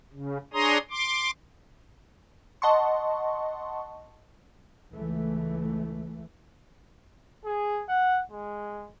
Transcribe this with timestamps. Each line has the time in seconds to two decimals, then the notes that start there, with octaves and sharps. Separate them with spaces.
0.13 C#3
0.54 D4 G#4 C#5 A#5 C6 D#6
0.91 C6 D6
2.62 D#5 F#5 A5 C6 C#6
4.91 C#2 E3 A3
7.45 G#4
7.89 F#5
8.31 G#3